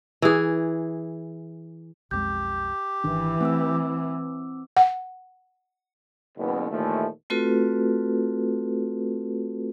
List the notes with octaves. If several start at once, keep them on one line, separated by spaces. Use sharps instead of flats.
E3 G#4
B1 F2 G#3 G4 G6
G#1 D#3 E3 D4
A3 C4 D6 E6
F#5
F#1 D#2 B2 B3
D#2 A#2 E3 F3 A3
A3 C4 F4 F#4 A4 B4